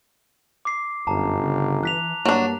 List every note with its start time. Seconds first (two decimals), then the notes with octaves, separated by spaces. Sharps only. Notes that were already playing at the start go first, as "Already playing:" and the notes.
0.65 D6 C7
1.07 G1 F#2 A5 A#5
1.40 C#3
1.83 E3 F#6 B6 F7
2.25 G2 F#3 A#3 D4